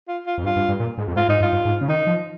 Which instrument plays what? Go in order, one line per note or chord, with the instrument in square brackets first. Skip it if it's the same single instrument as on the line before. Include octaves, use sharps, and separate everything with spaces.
[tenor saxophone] F4
F4
[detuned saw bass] F2
[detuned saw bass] G2 [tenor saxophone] F4
[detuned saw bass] G2
G2
A#2
G#2
F2
[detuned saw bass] G#2 [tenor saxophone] F4
[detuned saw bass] G#2 [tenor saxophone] D#4
[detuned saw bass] G2 [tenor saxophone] F4
[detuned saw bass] G2
G#2
C#3
[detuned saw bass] D#3 [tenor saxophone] D#4
[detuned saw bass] F3